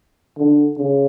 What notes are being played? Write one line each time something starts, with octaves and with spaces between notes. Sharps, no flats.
D3
C#3